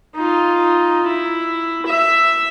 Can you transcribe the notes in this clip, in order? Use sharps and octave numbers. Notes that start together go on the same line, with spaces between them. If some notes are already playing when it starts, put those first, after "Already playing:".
D#4 F4
E4
E5